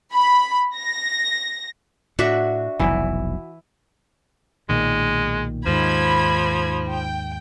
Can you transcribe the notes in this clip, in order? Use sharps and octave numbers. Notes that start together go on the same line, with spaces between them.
B5
A#6
A2 D4 F#4 E5
F1 B1 B2 E3 E4
B1 A#2 D#3 G#3
D#2 G#2 D#3 F3 B5 G#6
G5